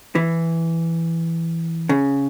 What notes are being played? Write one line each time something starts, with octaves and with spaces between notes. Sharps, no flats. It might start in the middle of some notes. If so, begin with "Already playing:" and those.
E3
C#3